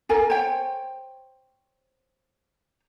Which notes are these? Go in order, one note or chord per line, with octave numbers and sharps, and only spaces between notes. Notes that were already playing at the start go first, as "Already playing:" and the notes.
A4 A#4 G#5
C5 C#5 G5